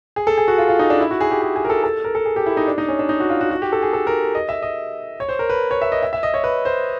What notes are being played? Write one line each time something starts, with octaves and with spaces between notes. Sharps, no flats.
G#4
A4
G#4
F#4
F4
F4
D#4
D4
E4
F#4
G#4
G4
G#4
G#4
A#4
A4
A4
A#4
A4
G#4
G4
E4
D#4
D4
D#4
C#4
D4
D#4
F#4
F4
F#4
F#4
G4
A4
G#4
A4
A#4
D#5
E5
D#5
C#5
C5
A#4
B4
C#5
E5
D#5
E5
E5
D#5
C#5
B4
C5